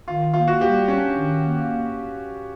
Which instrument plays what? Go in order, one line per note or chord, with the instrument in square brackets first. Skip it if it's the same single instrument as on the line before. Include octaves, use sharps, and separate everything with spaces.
[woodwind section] D#3 [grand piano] F4
[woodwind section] A#3 [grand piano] F4
[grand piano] F#4
[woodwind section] G3 [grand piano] G4
[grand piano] C#4 [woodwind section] D4
[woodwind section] D#3
A#3